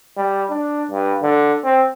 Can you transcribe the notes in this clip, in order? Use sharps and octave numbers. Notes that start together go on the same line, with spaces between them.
G3
D4
G2
D3
C4